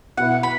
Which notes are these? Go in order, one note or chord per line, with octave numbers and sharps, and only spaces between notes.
B2 B3 E4 F#5
B5